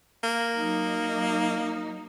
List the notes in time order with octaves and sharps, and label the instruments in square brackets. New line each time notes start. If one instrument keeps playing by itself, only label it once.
[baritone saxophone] A#3
[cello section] F#3 D#4